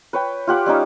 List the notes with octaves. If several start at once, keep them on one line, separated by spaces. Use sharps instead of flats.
B4 C#5 G5
F4 G4 F#5 D6
G3 C#4 D#4 D6